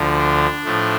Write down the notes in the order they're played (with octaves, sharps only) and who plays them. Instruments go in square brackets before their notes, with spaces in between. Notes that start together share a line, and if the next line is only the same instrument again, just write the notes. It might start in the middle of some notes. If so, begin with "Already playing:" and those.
Already playing: [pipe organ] D2 D3 F3
D4
A2 F3 A3